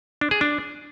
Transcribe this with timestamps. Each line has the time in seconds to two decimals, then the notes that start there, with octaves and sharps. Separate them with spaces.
0.21 D4
0.31 G#4
0.41 D4